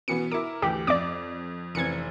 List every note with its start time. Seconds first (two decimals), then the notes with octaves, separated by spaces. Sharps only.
0.08 B2 E3 B3 C#7
0.31 E4 A#4 D6
0.62 D2 E3 G4
0.87 F2 D5 D6
1.75 F1 E3 C4 G#6 C#7